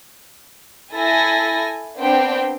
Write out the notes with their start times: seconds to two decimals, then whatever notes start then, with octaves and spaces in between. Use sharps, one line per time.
0.93 E4 A4 G#5 A#6
1.99 B3 C4 D4 C5 G5